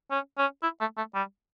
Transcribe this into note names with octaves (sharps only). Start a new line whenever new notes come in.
C#4
C#4
E4
A3
A3
G3